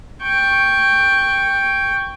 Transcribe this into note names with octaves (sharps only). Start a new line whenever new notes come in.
G5 C#6